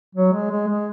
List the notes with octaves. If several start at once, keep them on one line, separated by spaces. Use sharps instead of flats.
F#3
G#3
G#3
G#3